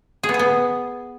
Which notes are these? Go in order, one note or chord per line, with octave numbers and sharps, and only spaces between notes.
G#4
B3
G#4
B3